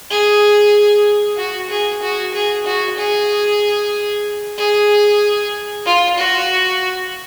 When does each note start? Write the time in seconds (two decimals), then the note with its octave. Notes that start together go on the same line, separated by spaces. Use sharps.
0.11 G#4
1.38 F#4
1.70 G#4
2.02 F#4
2.34 G#4
2.66 F#4
2.98 G#4
4.58 G#4
5.86 F4
6.18 F#4